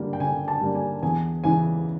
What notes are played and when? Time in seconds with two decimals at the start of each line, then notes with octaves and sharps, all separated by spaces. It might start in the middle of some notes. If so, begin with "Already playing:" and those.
Already playing: D3 G3 A#3 D4
0.13 G5
0.20 D3 G#5
0.48 A5
0.61 G3 A#3 D4
0.75 G#5
1.02 E2 G#5
1.44 C#3 E3 G#5